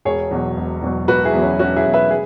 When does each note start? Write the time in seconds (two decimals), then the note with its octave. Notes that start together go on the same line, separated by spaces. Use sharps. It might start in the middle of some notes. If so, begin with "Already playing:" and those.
0.05 E1 G#4 C#5
0.31 E2 B2 F#3
0.57 E1
0.82 E2 B2 F#3
1.08 E1 F#4 B4
1.25 E4 G#4
1.34 E2 B2 F#3
1.42 C#4
1.59 E1 C#4 F#4
1.76 E4 G#4
1.85 E2 B2 F#3
1.93 B4 E5
2.11 G#4